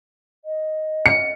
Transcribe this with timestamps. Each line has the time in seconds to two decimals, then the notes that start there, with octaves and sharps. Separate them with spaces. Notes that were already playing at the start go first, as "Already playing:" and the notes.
0.45 D#5
1.06 C#7